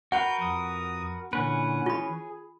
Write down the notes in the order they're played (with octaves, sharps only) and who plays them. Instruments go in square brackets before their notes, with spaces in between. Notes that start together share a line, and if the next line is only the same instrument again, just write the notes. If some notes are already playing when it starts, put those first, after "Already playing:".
[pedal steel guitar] F#4 A#4 B4 [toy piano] F#5 [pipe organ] G6
[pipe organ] F2 D#6
[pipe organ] A#2 D3 F#5 [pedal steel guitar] E3 C#4 B4
[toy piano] F4 B5 [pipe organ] G#4